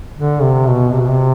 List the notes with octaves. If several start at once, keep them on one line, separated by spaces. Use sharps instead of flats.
D3
C3
B2
C3
B2
C3